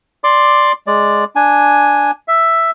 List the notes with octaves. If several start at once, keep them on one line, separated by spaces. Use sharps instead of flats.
D5 C6 D6
G#3 D5
D4 G#5
E5